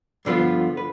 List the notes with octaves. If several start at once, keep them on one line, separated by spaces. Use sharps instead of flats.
G2 D3 F3 B3 F4
B4